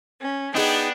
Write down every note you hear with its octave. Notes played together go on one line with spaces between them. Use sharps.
C#4
B3 D4 D#4 G#4 G5